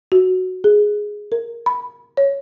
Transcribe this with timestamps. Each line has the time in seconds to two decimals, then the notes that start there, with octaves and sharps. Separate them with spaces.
0.12 F#4
0.64 G#4
1.32 A#4
1.66 B5
2.17 C#5